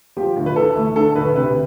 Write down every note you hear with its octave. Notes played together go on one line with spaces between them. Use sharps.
F3 G4
D2
B4
E3 A4
A3
D3 A4
D2 B4
C3 B4